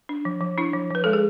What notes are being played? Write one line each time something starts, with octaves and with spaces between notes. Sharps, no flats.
D4
F3
F3
D4 E4
F3
F3 B4
G#3 A4
G#4